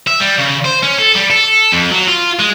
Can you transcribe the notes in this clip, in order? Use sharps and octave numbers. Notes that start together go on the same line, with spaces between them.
E5
G3
C#3
C5
C#4
A4
G3
A4
F2
F#3
F4
G#3